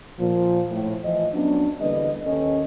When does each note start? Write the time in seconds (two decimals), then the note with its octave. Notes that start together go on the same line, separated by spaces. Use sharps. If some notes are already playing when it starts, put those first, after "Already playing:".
0.19 A#2 F3
0.70 A2
1.03 E3 F3 D#5
1.33 F#3 B3 C#4 D4
1.80 E2 D3 G3 A#3 B4 D#5
2.26 D#2 D#3 C#4 A4 D#5